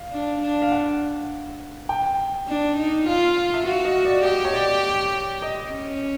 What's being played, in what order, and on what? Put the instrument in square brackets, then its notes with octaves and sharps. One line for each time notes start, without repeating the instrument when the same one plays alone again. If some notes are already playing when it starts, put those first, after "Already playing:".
Already playing: [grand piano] F5
[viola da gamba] D4
D4
[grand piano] F5
F#5
G5
[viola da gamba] D4
D#4
[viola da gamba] F4 [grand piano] F5
[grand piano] F5
E5
[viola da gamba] F#4 [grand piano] F5
[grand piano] D#5
D5
[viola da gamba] G4 [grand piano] D#5
[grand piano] C#5
D5
D#5
[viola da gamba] C#4